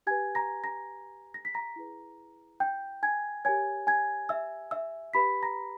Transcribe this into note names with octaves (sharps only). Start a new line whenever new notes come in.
G4 B4 G#5 G#6
A#5 A#6
A#5 A#6
A#6
B6
A#5 A#6
E4 G#4 B4
G5 G6
G#5 G#6
G4 A#4 C#5 G#5 G#6
G#5 G#6
E5 E6
E5 E6
G4 B4 B5 B6
A#5 A#6